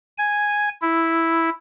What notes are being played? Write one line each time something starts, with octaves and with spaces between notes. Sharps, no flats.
G#5
E4